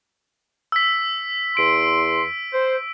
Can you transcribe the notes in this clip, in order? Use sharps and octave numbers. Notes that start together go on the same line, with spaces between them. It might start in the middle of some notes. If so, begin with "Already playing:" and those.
E6 B6
E2 C6 D7
C5